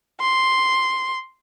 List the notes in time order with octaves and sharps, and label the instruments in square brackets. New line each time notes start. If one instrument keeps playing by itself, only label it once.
[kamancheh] C6